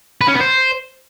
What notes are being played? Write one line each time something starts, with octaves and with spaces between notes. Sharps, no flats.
B4
C#4
B3
C5